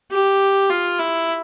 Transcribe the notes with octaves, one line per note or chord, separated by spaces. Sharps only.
G4
F4
E4